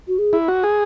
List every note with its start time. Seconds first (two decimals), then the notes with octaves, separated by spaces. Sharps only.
0.08 F#4
0.19 G#4
0.33 E4
0.48 F#4
0.63 G#4